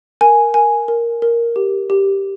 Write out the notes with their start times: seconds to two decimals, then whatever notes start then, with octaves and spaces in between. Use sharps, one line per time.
0.21 A#4 G#5
0.54 A#4 G#5
0.88 A#4
1.22 A#4
1.56 G4
1.90 G4